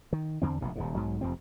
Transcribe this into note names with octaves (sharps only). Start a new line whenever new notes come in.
D#3
E2 D3 C4
F1 A#1 B2
D#1 D#2 G#2
B1 G#2 F#3
F1 F2 C3 C4